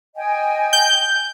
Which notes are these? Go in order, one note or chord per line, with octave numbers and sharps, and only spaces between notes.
D#5 G5 G#5
G6